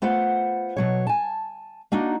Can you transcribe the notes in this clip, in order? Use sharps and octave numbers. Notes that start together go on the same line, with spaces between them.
A3 B3 F4 C5 F#5
B2 F#3 C#5
G#5 A5
A#3 D4 D#4 F#4